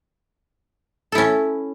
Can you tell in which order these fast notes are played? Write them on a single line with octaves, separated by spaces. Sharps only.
A4 E4 C#4